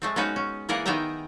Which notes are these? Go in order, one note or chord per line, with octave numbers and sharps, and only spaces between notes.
G#3 A3 C4
G#3 B3 C#4 D#4 F#4 B4
C#4
E3 A#3 G#4 A#4 D5 F#5
D#3 B3 G#4 E5 G5 A#5